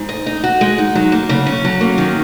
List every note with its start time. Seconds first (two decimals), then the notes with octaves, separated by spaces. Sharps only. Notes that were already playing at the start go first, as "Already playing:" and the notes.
Already playing: G#2
0.09 D#5
0.26 D#4
0.44 F#4
0.61 G#3
0.78 D#4
0.95 F#3
1.12 A#3
1.29 C#3
1.46 C#4
1.65 F#3
1.81 A#3
1.98 D#3